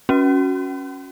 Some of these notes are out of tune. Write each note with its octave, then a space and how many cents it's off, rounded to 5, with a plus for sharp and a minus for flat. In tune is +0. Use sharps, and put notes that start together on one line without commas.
C#4 +0 F#4 -5